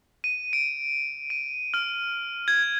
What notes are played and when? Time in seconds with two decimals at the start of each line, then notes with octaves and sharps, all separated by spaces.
0.24 D#7
0.53 D7
1.30 D#7
1.74 F6
2.48 G#6